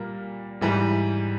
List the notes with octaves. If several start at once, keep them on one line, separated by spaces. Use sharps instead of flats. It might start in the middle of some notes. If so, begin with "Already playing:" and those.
Already playing: A#2 G3 A#3
G#2 E3 G3